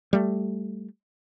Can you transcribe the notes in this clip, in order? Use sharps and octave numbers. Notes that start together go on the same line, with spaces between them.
G3 A3